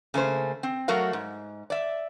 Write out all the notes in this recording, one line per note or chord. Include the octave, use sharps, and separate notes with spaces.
C#3 A3 A#3 C5
C4
F#3 A3 F#4 A#4 F5
G#2
D5 E5